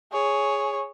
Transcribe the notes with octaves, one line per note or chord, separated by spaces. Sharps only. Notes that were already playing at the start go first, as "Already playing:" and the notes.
G#4 C#5